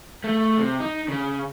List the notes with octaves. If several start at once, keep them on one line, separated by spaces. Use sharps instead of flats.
A3
C3
D#4
C#3